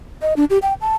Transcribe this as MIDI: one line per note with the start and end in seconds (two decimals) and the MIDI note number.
0.22 0.34 75
0.37 0.45 62
0.50 0.58 67
0.62 0.74 79
0.81 0.96 81